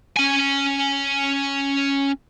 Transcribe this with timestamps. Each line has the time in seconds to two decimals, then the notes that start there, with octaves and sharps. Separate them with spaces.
0.17 C#4 G#5